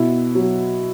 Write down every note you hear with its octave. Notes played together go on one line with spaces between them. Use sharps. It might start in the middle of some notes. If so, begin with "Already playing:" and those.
Already playing: B2 E4
F#3